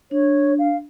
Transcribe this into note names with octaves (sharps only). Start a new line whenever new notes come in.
D4 C#5
F5